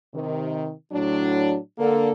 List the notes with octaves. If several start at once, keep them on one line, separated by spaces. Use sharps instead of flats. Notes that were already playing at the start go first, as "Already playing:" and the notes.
C3 D#3
A2 F#3 D4
D3 A#3 A4